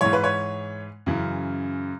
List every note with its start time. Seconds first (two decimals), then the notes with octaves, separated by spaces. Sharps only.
0.01 G#2 E3 C#5
0.13 B4
0.24 C#5
1.06 F#2 C#3 E3